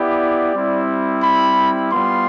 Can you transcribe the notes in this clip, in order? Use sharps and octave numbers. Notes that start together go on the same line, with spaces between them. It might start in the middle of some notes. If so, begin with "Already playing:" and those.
Already playing: B3 E4 G4 D5
G3 C4 E4
B5
G3 B3 F4 C6